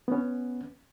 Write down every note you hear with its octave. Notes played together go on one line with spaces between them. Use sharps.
B3 C#4